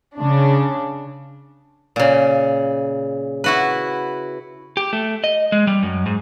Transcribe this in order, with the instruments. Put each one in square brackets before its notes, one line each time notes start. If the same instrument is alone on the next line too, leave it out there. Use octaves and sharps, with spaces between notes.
[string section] C#3 D4
[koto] A#2 C#3
E4 F#4 B4
[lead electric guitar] G4
A3
D#5
G#3
G3
F#2
G#2